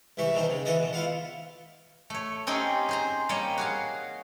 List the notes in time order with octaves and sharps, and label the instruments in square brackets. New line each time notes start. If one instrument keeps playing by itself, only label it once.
[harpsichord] C2 E3 E5 C#6
B2 D#3 C4 D#4
C#3
E3 F#4 A4 D#5
B2
E4 F4 F5 F#5
[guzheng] A3 C#5
C4 C#4 D#4 G4 G#4
G#4 C5 A#5
G3 A#3 C#5 D#5
F#4 G#4 F5